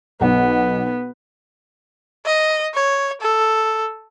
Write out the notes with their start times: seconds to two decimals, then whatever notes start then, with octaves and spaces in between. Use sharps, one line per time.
0.21 B1 B3 F#5
2.25 D#5
2.74 C#5
3.21 A4